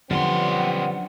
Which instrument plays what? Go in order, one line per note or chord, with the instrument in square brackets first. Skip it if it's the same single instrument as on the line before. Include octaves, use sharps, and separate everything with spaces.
[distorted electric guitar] F#2 C6 [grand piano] D3 F3 [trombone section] G3 B3 C4 [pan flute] F#5